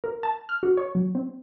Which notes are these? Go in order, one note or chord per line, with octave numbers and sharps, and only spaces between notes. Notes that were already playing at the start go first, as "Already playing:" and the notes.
A#4
A5
F6
F#4
C#5
F#3
C4